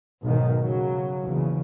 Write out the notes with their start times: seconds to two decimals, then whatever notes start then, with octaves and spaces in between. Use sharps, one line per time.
0.22 B1 G#2 B2 D#3
0.60 C#3 F#3
1.22 A#1 E2 C#3